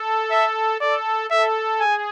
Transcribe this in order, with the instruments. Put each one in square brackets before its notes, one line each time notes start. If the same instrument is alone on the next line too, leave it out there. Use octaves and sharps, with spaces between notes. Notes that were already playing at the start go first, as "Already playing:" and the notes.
Already playing: [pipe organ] A4
[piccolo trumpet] E5
[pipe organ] A4 [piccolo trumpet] D5
[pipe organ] A4 [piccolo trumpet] E5
[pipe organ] G#4 [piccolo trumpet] G#5